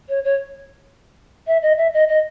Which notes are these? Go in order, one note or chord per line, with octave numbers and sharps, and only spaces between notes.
C#5
C#5
E5
D#5
E5
D#5
D#5